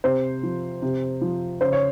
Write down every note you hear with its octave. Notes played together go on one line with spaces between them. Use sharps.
C3 C5
F3
C3
F3
C#3 C5
C#5